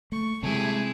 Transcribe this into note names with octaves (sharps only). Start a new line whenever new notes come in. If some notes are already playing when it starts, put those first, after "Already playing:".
A3 C#6
C3 G3 G#3 E4 G#4 A4